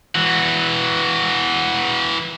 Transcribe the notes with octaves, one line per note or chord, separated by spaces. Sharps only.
E3 F#4